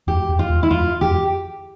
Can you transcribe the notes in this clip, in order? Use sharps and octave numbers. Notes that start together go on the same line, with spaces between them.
F2 G4
F2
F4
E2
E4
F2 F4
F2 G4